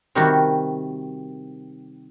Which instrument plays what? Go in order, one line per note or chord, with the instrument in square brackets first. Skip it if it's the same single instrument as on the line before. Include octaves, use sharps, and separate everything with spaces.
[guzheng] C3 D#3 G3 F#4 G4 A#4